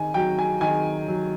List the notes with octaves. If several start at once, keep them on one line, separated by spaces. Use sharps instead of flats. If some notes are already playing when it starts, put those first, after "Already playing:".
Already playing: D#3 G#5
F#3 G5
G#5
D#3 G#5
F#3